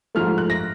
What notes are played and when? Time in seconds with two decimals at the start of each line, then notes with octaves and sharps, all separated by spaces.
0.15 G#2 F3 A3 F6
0.38 F#6
0.50 A#6